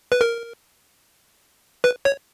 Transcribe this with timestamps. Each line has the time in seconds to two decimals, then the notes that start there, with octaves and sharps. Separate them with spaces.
0.12 B4
0.21 A#4
1.84 B4
2.05 C#5